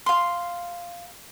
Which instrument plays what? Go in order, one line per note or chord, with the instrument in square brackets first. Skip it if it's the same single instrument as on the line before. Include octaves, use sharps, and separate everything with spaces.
[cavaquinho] F5 C6